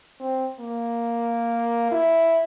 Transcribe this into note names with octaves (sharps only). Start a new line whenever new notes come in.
C4
A#3
E4